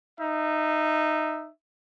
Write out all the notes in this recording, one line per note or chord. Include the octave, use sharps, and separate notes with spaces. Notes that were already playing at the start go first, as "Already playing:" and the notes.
D#4 E5